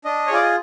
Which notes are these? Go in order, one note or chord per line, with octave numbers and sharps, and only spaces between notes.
D4 D#5
C#5
F4 G#4 D5
D#5